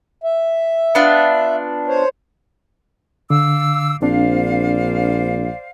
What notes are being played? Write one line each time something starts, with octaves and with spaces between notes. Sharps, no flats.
E5
B3 D4 F4
C5 C#5
D3 F5 D6 E6
A#1 C4 D4 C5 D5 F5